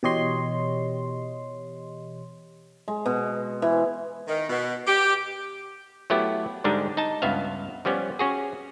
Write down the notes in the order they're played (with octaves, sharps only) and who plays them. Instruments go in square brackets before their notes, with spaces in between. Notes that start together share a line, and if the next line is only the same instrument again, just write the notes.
[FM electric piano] B2 E3 G4 C#5 D#5 C6
[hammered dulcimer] G#3
B2
E3
[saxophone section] D#3
B2
G4
[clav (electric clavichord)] F#3 A3 B3 E4 G4
G#2 D3 G3 G#3 D4 D#4
D#4 A5
C#2 G2 B3 E5 F5
F3 G3 B3 C#4
C#4 F#4 G#4